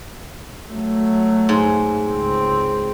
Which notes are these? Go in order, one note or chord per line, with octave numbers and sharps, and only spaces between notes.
F#3 A3
G#2
C#2 C4